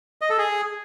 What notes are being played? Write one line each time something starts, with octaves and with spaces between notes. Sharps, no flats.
D#5
A4
G#4